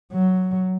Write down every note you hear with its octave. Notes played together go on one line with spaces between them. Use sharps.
F#3